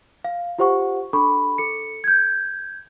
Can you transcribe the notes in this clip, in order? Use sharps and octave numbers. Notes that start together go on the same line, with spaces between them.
F5
F4 G4 C5 F#5 C#6
D4 A4 B5 C#6
A4 C#7
G6 G#6